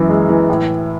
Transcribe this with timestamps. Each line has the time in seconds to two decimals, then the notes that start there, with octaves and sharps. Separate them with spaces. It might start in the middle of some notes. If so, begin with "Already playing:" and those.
Already playing: F#2 E3
0.09 G#3
0.29 E3
0.49 A2